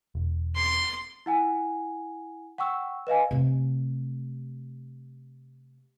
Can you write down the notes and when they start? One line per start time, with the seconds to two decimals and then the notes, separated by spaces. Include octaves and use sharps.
0.15 E1
0.55 C6
1.26 E4 F#5 G#5
2.58 F#5 G5 C#6 E6
3.07 B4 D#5 F5 G#5
3.31 C3 A3